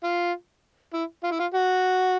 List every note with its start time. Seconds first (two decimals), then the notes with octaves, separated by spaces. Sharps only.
0.04 F4
0.94 E4
1.24 F4
1.32 E4
1.40 F4
1.54 F#4